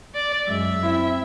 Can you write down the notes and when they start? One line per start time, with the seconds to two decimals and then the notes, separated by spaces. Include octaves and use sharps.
0.15 D5
0.47 F#2 G#3 E5
0.83 C4 E4